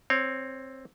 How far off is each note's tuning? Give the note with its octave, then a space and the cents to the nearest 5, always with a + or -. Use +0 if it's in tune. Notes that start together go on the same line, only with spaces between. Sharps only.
C4 +10 C#5 +0